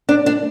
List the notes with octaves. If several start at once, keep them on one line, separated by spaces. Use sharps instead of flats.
D4
D4